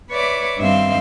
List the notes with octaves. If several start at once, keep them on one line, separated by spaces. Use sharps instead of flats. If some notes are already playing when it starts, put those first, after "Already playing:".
B4 C#5 D5 E5 D6
G2 D#3 C4 E5 F5 C6